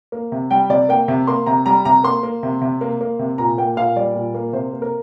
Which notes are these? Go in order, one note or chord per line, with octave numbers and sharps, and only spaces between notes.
A#3
C3
G3 G5
C3 D5
A#3 G5
C3
A#3 C6
C3 A#5
G3 A#5
C3 A#5
A#3 C6
A#3
C3
C3
A#3
A#3
C3
A#2 A#5
A#3 G5
A#2 F5
G3 D5
A#2
A#3
C3 C5
A#3
A#4